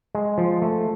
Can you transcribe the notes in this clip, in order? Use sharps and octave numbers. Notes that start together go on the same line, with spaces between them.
G#3
F3
A3